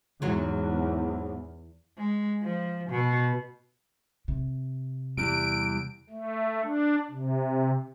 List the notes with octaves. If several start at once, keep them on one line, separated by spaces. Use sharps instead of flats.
E2 G#2 F#3
G#3
F3
B2
C3
E2 G3 D7
A3
D4
C3